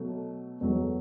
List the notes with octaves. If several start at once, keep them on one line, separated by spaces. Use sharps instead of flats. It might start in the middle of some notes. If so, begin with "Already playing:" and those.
Already playing: B2 F#3 A3
E2 B2 F#3 A3